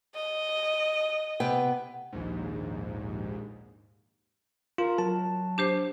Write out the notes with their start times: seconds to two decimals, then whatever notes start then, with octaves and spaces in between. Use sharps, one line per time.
0.15 D#5
1.40 C3 B3 G5
2.13 A#1 D#2 G#2
4.78 F4 A#4
4.98 F#3 A5
5.58 D4 G4 C5